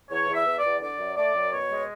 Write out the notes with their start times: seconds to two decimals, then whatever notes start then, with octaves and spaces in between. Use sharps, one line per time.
0.10 E2 C#5
0.28 E2
0.34 E5
0.46 E2
0.58 D5
0.64 E2
0.81 D3 D5
0.99 F#2
1.16 A3 D5
1.34 F#2
1.52 B2 C#5
1.70 G#3